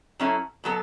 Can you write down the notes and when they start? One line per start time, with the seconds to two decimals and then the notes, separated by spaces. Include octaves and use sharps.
0.20 F#3 C#4 E4 A4
0.64 B2 F#3 B3 A4